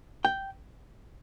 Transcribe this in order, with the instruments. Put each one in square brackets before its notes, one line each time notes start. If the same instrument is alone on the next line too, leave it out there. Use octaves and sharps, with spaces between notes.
[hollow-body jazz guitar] G5